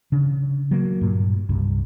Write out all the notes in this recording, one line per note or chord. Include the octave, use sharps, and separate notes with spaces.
C#3 D4
F#3 A#3
G2 A#2
C2 G2